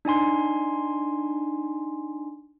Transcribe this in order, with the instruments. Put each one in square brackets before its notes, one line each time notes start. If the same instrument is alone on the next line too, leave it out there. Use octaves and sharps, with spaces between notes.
[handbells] D4 D#4 G#5 C6